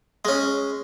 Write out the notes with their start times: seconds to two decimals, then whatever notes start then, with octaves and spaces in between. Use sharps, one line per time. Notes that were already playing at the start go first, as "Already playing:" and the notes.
0.25 G#3 C#4